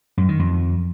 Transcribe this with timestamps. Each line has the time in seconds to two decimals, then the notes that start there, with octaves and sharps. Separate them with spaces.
0.17 F#2
0.28 D#3
0.39 F2